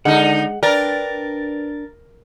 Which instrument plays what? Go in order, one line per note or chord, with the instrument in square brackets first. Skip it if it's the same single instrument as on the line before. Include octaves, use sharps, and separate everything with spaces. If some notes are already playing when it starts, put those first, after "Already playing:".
[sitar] D3 D#4 [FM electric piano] G#3 [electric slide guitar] F#5
[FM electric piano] D4 A6 [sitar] A#4 [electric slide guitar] B4 G5